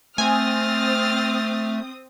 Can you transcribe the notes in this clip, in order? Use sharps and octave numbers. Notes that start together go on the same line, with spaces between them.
A3 C4 G#5 D#6 F6 A6